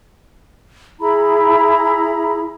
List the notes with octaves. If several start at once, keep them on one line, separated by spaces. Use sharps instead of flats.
E4 G#4 A#5 B5